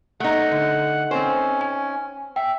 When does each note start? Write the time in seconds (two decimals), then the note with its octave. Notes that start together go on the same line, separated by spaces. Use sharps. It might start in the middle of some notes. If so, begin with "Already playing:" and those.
0.20 A3 D#4 F#5
0.52 D3
1.11 C4 C#4 C5
1.61 G#5
2.36 E5 G5